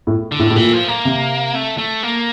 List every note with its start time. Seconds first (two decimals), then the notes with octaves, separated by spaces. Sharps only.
0.07 A2
0.32 D3
0.39 A2
0.50 A2
0.56 A#2 E3
0.73 F3
0.88 A#3
1.05 C3
1.55 A3
1.78 A3
2.03 A#3